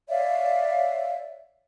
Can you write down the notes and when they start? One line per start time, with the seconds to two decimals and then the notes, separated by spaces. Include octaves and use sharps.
0.09 C#5 D5 E5 F5